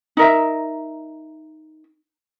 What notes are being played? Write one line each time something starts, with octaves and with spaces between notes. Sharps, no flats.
D#4 A#4 E5